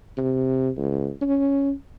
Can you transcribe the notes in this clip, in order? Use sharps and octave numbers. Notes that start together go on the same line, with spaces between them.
C3
C#2
C#4